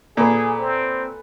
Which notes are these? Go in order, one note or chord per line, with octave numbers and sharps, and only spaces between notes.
A#2 G#4 A4 B4 G#5
C4